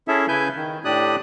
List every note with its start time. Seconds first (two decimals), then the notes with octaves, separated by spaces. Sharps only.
0.08 C#4 E4 G#4 A4 E5
0.28 C#3 E4 B4 G#5 G6
0.56 D#3
0.85 A2 D4 G4 D5 D#6 F#6